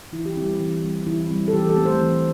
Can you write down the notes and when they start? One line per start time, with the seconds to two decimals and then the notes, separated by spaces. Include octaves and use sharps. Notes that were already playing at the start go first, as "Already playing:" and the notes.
0.12 E3 E4
0.25 G4
0.37 G3 C4 E4
0.60 E3
0.84 G3 C4
1.06 E3 E4
1.30 G3 C4
1.48 A4
1.53 E3 G4
1.69 A4
1.77 A3 C4
1.85 C5
2.01 E3